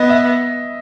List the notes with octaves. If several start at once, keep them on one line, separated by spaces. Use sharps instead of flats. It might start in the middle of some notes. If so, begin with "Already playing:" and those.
Already playing: B3 D#5
E5